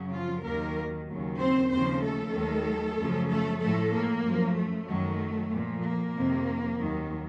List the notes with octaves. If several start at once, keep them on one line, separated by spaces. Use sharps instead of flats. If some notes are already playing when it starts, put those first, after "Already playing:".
Already playing: F#2 C#3 F#3
F3 F4
D#2 D#3 F#3 A#3 A#4
D#2 C#3 F#3
C4 C5
D#2 C#3 F3 C4 C5
A3 A4
D#2 D#3 F#3
F#2 C#3 F3
A3 A4
A2 F3 A3 A4
A#3
F#2 F3
A3
F#2 D#3 F#3
A#2 F3
A#3
F2 C3 D#3
D#2 D#3 F#3